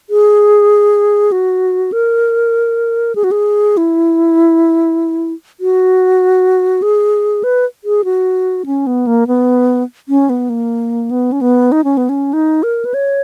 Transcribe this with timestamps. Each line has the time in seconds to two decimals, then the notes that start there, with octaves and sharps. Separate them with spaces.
0.10 G#4
1.32 F#4
1.92 A#4
3.15 G#4
3.24 F#4
3.31 G#4
3.77 E4
5.60 F#4
6.82 G#4
7.44 B4
7.84 G#4
8.05 F#4
8.66 C#4
8.87 B3
9.07 A#3
9.27 B3
10.09 C#4
10.29 B3
10.49 A#3
11.11 B3
11.32 C#4
11.41 B3
11.72 D#4
11.84 C#4
11.97 B3
12.09 C#4
12.33 D#4
12.63 A#4
12.85 B4
12.94 C#5